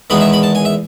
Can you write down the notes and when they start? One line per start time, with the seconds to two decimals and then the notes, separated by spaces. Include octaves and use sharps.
0.10 E2 D#3 G#3 B3 B5
0.21 E5
0.33 B5
0.43 A5
0.55 G#5
0.65 E5